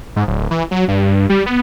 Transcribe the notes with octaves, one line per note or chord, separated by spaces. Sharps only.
G#2
D1
E3
F#3
G2
G3
B3